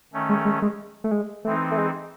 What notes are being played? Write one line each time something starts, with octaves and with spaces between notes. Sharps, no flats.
D#3 A3 C#4
G#3
G#3
G#3
A3
G#3
E3 A3 C4 D#4
A3
G#3